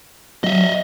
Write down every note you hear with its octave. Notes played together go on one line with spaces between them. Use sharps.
F#3 D#5 E5